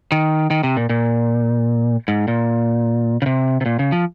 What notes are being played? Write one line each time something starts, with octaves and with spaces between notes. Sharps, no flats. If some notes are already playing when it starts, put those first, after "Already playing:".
D#3
D#3
C3
A#2
A#2
G#2
A#2
C#3
C3
C3
A#2
C#3
F3